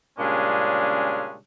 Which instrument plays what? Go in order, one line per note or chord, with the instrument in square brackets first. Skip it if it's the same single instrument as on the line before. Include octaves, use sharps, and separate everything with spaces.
[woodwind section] A#2 C#3 G3 G#3 C#4 D4